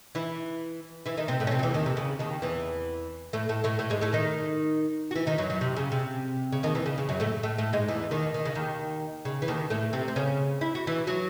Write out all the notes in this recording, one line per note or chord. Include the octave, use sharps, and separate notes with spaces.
E3 E4
E3 E4
D#3 D#4
C3 C4
A2 A3
C#4
C3 C4
F#3
E2 E3
D#2 D#3
C3
C#3
D#2 D#3
E2 E3
A2 A3
A2 A3
A2 A3
A2 A3
G#2 G#3
A2 A3
D#3 D#4
F#4
E3 E4
D#3 D#4
F#2 F#3
F#2 F#3
C3
C#3
C3
C#3
D#2 D#3
E2 E3
C#3
C#3
F#2 F#3
A2 A3
A2 A3
A2 A3
G#2 G#3
E2 E3
D#2 D#3
D#3
C#3
D#2 D#3
C#3
E3
D#2 D#3
A2 A3
C3 C4
C4
C#3 C#4
E4
F#4
E3 E4
F#3 F#4